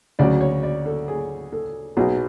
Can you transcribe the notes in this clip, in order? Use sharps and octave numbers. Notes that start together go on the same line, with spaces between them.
D2 C#3 F#3 D5
C#5
D5
A4
G#4
A4
B1 B2 F#3 G#4